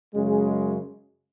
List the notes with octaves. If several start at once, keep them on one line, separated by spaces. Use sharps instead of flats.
F#2 C#3 G#3